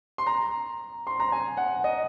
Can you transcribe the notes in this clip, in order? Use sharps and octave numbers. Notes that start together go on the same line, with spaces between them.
C6
A#5
C6
A#5
G#5
F#5
D#5